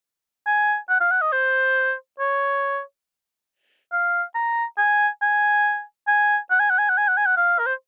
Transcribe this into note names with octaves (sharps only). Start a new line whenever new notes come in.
G#5
F#5
F5
F#5
D#5
C5
C#5
F5
A#5
G#5
G#5
G#5
F#5
G#5
F#5
G#5
F#5
G#5
F#5
G#5
F#5
F5
A#4
C5